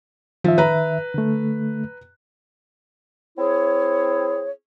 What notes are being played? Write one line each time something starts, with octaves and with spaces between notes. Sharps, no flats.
D#3 F3 E5
B4 A#5
D3 A3
C4 E4 G#4 C#5